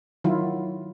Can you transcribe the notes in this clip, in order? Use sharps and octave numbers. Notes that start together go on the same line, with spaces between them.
D#3 F#3 E4 F4